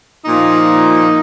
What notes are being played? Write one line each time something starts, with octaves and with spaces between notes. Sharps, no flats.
A#2 F3 A#3 D#4